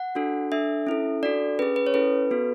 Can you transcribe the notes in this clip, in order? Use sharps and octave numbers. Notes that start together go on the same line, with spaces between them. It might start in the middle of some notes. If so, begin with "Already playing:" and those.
Already playing: F#5
D4 F#4 A4
D4 A4 E5
C#4 E4 A4
D4 F#4 A4 D5
C#4 G#4 B4
B4
C#5
C#4 E4 A4 B4
B3 F#4 A4